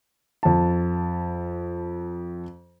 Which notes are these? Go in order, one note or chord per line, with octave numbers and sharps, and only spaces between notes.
F2 A5